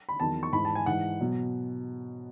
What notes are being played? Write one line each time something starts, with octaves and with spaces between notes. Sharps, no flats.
B5
E2 D#3 F#3 A5
C#6
G#2 E3 B5
A5
G#5
G#2 E3 F#5
B2 F#3